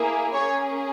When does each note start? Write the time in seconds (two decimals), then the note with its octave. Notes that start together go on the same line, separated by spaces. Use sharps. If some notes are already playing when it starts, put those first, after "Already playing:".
Already playing: A#3 E4 G#4
0.34 A#3 C#4 G#4 C#5